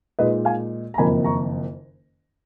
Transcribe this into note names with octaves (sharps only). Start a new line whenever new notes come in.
A#2 G#3 D#4 B4 D#5
F5 G#5
A#5
F#1 F2 D#3 A#3 G#5 B5
A#5 C#6